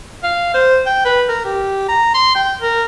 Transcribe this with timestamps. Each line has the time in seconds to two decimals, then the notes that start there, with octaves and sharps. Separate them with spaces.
0.23 F5
0.54 C5
0.86 G5
1.05 B4
1.28 A#4
1.45 G4
1.88 A#5
2.14 C6
2.35 G5
2.61 A#4